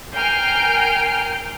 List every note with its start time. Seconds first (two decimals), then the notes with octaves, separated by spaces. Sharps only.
0.14 A#4 G5 G#5 F6 C7 D7